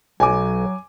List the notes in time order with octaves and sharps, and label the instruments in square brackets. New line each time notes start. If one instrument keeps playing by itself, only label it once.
[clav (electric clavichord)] B1 [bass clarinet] F#3 [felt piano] G#5 D6